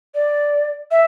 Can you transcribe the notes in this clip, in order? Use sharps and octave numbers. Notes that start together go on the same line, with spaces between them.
D5
E5